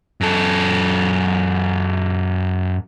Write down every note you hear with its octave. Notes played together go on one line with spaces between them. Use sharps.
F#2 A4